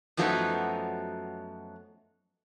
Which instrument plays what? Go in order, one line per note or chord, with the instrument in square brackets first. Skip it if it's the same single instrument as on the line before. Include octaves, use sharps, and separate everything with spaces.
[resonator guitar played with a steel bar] F#2 F3 F#3 A3 B3 D#4